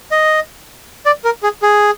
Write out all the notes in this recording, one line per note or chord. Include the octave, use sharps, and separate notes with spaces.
D#5
D5
A#4
G#4
G#4